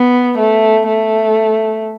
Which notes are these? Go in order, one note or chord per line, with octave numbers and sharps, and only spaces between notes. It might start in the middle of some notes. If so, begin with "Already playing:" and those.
Already playing: B3
A3
A3